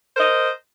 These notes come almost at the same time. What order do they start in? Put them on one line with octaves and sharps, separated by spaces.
C5 A#4 D#5